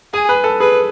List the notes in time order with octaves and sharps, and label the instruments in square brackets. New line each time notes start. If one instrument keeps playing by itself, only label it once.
[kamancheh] G#4 [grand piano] G#5
[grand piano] B4
A4
[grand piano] G#4 [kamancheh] B4